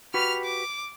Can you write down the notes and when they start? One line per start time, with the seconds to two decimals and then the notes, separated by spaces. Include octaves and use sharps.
0.14 F#4 G4 B4 F6 F7
0.45 D6